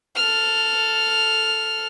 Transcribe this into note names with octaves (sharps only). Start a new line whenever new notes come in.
A4 F6